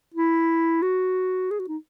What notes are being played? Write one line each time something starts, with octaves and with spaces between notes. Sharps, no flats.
E4
F#4
G#4
F#4
D#4